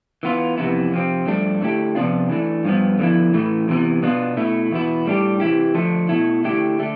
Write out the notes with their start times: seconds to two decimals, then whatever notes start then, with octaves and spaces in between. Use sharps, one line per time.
0.23 E3 B3 F4
0.57 F2 C3 E3 B3 E4
0.92 C3 F3 C4
1.26 G2 F3 A3 D4
1.61 D3 A3 E4 G4
1.95 C3 F3 B3 D4 F4
2.29 E3 A3 D4
2.65 G2 F3 B3
2.99 D3 F3 B3 E4
3.33 A2 E3 A3
3.68 E2 C3 E3 B3
4.02 B2 B3 D4 F4
4.37 B2 A3 E4
4.71 E2 B2 B3 E4
5.06 A2 G3 D4 G4
5.40 C3 E3 A3 E4 G4
5.75 D3 F3 A3
6.09 B2 A3 E4
6.44 D3 A3 E4 G4
6.79 D3 A3